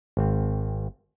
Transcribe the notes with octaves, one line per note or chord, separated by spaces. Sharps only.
G#1 C4